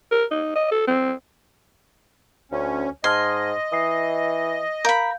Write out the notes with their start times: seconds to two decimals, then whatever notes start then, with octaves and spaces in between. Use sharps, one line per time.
0.11 A#4
0.31 D#4
0.56 D#5
0.71 A4
0.87 C4
2.52 D2 C#4
3.04 G#2 D#5 A5 C6 F6 G#6
3.72 E3 D#6 C7
4.85 A#4 F5 B5 G6